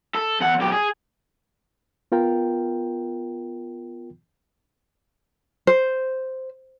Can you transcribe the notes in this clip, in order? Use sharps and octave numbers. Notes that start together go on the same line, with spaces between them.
A4
E2 F#5
B1 G4
G#4
B3 F4 A#4 G5
C5